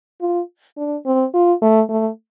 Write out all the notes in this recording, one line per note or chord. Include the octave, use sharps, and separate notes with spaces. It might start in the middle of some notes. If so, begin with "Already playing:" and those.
F4
D4
C4
F4
A3
A3